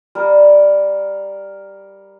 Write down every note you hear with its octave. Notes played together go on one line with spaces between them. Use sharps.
G3 A#4